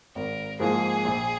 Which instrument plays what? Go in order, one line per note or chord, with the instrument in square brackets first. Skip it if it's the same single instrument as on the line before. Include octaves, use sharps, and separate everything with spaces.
[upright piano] G#1 [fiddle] A#4
[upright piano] G#2 F3 A#3 [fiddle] G#4
[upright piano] A#1